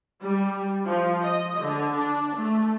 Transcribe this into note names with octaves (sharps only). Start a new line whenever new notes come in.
G3
F3
D#5
D3
D4
A3